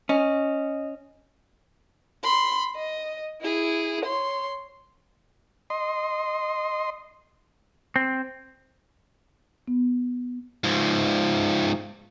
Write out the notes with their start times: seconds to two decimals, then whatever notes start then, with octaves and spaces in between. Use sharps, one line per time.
0.09 C#4 D#5
2.23 B5 C6
2.75 D#5
3.42 E4 G#4
4.05 C#5 C6
5.70 D#5 C6
7.96 C4
9.67 B3
10.64 G#2 F3